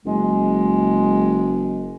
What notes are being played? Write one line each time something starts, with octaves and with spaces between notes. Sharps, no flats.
F#1 G#3